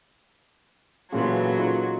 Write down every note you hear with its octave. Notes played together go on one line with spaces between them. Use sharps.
A#2 C#3 E3 F#3 B3 A4 C6
D#4 F4 A#4